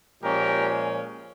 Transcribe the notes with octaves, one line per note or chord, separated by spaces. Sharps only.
A#2 F3 G#3 C#4 G4 A#4